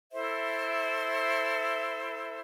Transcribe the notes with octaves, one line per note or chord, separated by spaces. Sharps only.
E4 A4 C5 E5